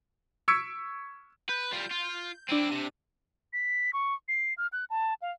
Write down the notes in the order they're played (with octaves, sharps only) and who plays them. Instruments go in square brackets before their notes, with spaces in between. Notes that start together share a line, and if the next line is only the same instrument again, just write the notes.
[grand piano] C#6 E6 G#6 B6 C#7 D7
[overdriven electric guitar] B4 [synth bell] G6
[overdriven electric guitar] G3 F4
F4
[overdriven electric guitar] C4 E4 [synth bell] D4 D#7
[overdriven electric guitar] C3
[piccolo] B6
C#6
C7
F6
F#6
A5
F5